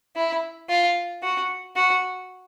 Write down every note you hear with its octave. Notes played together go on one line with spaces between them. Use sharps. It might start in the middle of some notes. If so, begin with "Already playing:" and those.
E4
F4
F#4
F#4